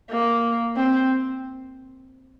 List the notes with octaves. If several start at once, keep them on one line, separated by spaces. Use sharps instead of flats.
A#3
C4